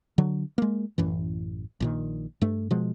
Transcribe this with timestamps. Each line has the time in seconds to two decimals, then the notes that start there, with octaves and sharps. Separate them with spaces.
0.18 D3 F#3
0.58 G#3 A#3
0.98 A1 F#2 E3
1.80 A#1 A#2 D#3
2.41 G2 A3
2.71 B2 F3 G#3